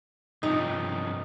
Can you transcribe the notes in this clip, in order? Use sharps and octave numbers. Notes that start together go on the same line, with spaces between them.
G2 C3 F3 D#4